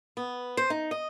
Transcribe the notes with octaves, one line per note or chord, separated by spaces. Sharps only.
B3
C5
D#4
D#5